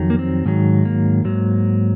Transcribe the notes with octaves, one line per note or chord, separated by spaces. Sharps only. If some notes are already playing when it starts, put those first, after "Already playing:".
Already playing: F2 D#3 F#3
A#3
C4
G#2 D#3 F#3
A#3
G#2 F#3